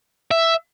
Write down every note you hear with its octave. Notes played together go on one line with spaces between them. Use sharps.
E5